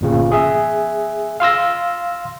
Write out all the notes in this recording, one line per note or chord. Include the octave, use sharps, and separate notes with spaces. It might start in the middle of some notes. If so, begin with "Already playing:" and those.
G1 A#2 C#3
G#4 E5
F5 C6 E6 A#6